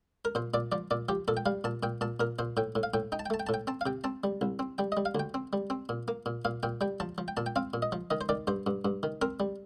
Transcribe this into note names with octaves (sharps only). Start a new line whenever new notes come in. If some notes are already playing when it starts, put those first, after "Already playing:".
A#4
A#2 C5
A#2 D5
F3 D5
A#2 D5
F3 G4
A#2 A4
G5
G3 F5
A#2 A5
A#2 G5
A#2 A5
A#2 A#4
A#2 C5
A2 G5
A2
F5
A2 G5
D#4 G5
A5
G5
A3 A5
G5
A2 A5
G5
C4 A5
F5
C3 G5
C4 A5
G3
C2
C4
G3 G5
D#5
G3
F5
D2 G5
C4
G3
C4
A#2
A#3
A#2
A#2 F5
A#2 G5
G3 G5
F3 A5
F3
G5
A#2 A5
G5
C4 F5
A#2
D#5
F3
D#3 D#5
C5
D#3 D5
G2 C5
G2
G2
D#3
C4 A#4
G3